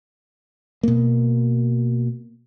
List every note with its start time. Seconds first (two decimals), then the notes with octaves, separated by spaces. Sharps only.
0.83 B2 A#3